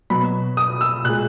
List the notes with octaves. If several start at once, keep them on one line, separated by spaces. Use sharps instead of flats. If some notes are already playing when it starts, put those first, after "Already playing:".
B2 F#3 B5
D#6
E6
A#2 G#3 F#6